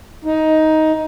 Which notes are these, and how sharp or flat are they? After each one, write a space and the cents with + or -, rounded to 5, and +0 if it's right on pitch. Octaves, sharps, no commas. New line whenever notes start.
D#4 +10